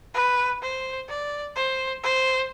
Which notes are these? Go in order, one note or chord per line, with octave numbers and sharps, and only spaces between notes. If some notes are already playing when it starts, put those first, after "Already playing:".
B4
C5
D5
C5
C5